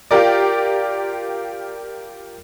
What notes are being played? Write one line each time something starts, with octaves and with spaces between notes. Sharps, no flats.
F4 G4 A#4 D5